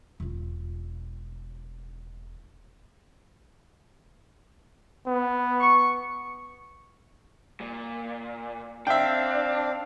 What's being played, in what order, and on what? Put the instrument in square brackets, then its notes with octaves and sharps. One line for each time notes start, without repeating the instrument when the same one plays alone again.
[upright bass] E1 F4
[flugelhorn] B3
[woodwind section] C#6
[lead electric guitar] A#2
[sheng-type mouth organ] C4 F5 [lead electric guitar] D4 [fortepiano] E5 G5